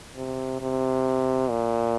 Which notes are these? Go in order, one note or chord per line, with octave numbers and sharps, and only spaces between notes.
C3
C3
A#2